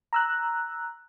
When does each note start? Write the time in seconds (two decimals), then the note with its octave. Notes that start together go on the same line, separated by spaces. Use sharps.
0.13 A#5 E6 F#6